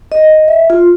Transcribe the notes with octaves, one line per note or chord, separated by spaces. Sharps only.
D#5
E5
F4